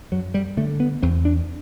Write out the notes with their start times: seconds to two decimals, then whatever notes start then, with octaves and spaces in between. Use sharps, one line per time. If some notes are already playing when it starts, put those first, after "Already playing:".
0.11 F#2 F#3
0.34 G3
0.57 D3 A3
0.80 B3
1.03 E2 C4
1.25 D4